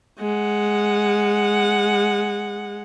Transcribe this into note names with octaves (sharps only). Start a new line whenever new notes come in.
G#3 F#5